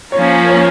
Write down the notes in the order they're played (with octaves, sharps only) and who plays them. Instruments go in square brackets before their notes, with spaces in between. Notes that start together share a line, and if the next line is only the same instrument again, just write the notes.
[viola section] F3 A#3 C#4 F4 A#4 [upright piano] C#5
[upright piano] C#5